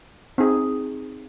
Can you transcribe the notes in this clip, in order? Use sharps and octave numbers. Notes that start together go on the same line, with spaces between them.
C4 D#4 G#4